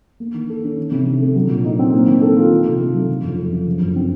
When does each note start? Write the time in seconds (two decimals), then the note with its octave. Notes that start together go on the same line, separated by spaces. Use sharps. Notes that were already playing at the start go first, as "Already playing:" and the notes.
0.20 A#3
0.34 D#3
0.49 A4
0.64 C#4
0.78 D#3
0.91 C3
1.06 C3
1.21 A3
1.35 F#3
1.49 A#2
1.65 D#4
1.79 C4
1.93 A#3
2.07 D#3
2.21 A4
2.37 F4
2.51 D#3
2.66 C3
2.80 A3
2.94 F#3
3.09 C#3
3.23 F2
3.38 A3
3.52 F3
3.67 C#3
3.81 F#2
3.96 C4